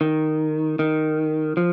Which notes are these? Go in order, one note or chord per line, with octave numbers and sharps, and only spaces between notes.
D#3
D#3
F3